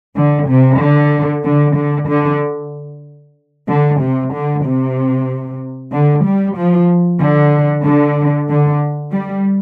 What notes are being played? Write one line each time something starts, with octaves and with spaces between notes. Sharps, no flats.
D3
C3
D3
D3
D3
D3
D3
C3
D3
C3
D3
G3
F3
D3
D3
D3
G3